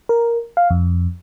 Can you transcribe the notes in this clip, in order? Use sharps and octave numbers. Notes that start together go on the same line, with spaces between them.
A#4
F5
F2